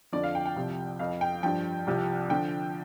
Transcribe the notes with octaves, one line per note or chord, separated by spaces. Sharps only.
F2 D3 F3 D5
F5
G5
G5
C2 C3 F3
F2 F3 F5
G5
G2 F3 G5
C2 C3 F3
D3 F3 G5